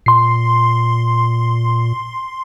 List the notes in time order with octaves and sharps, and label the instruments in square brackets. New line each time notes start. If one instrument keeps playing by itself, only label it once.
[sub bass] A#2 [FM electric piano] C6 C7